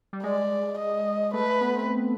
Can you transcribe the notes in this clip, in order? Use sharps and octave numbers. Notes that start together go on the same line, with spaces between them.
G3
G#3 D5
D#5
A3 B4
B3
C4